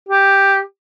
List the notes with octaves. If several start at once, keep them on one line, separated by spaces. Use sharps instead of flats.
G4